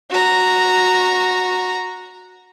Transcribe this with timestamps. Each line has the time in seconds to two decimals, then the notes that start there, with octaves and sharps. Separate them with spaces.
0.10 F#4 A#5